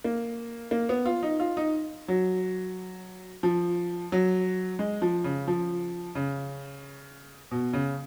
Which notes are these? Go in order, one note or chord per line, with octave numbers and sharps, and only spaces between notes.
A#3
A#3
B3
F4
D#4
F4
D#4
F#3
F3
F#3
G#3
F3
C#3
F3
C#3
B2
C#3